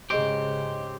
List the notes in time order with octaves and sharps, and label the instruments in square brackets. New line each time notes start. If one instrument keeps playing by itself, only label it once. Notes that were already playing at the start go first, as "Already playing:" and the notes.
[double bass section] G#2 C#3 [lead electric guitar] G4 C5 [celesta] G#4 D#5 D7